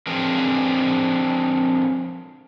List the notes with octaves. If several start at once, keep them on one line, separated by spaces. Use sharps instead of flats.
F3 C4 D4 G#4 A#4 B4